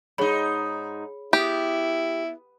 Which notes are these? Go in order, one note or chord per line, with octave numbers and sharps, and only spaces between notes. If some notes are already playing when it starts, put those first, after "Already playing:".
G#2 D#4 G#4 C#5 B5
B3 E4 G4